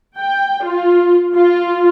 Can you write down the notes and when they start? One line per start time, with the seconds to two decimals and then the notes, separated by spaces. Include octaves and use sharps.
0.18 G5
0.64 F4
1.35 F4